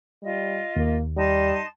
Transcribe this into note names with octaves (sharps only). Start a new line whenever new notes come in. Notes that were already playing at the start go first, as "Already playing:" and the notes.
G3 F4 D#5
D#2 A#3
G3 D#4 A5 C6